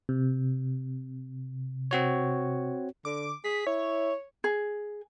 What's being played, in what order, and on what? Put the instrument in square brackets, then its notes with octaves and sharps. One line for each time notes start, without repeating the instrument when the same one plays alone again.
[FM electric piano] C3
[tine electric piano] C4 F#4 C#5
[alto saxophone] D3 [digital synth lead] D6
[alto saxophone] G#4 [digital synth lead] B6
[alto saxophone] E4 [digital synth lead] C#5
[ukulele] G#4